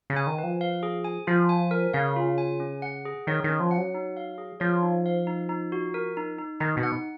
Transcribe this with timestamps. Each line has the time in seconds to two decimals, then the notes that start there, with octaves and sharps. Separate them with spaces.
0.10 C#3
0.16 G#5
0.27 D#3
0.38 B4
0.43 F3
0.61 F5
0.83 G#4
1.05 G#5
1.27 F3 F4
1.49 G#5
1.71 A#4
1.93 C#3 F5
2.16 F4
2.38 G#5
2.60 C#4
2.82 F#5
3.06 G#4
3.27 D#3 C#5
3.44 D#3
3.49 C#4
3.60 F3
3.71 F#5
3.77 F#3
3.94 D#4
4.17 F5
4.38 G#4
4.60 F3 C#5
4.83 D#4
5.06 F5
5.27 D#4
5.49 D#4
5.72 F#4
5.94 A#4
6.17 D#4
6.38 D#4
6.60 D#3 D#4
6.77 B2
6.83 F#5